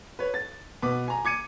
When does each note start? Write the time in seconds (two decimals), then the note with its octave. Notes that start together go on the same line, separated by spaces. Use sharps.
0.19 B4 C#5
0.34 A6
0.82 B2 B4 D6
1.08 G#5 A#5
1.25 D6 G#6 C#7 D#7